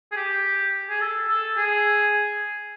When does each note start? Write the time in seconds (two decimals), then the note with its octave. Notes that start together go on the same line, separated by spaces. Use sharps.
0.12 G#4
0.16 G4
0.89 G#4
1.01 A4
1.29 A4
1.57 G#4